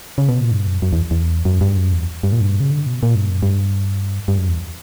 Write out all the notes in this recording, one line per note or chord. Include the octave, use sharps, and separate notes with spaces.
C#3
B2
A#2
G2
F#2
F#2
E2
E2
F#2
G2
F#2
E2
G2
A#2
G2
C#3
D3
B2
A#2
G2
F#2
G2
G2
F#2
E2